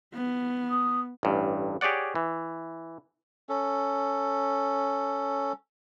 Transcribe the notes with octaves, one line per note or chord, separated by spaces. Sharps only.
B3
D#6
A1 G2
G4 G#4 C#5 D5 F#5
E3
C#4 A4